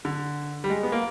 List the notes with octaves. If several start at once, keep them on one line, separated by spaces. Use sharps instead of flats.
D3
G3
G#3
B3
A#3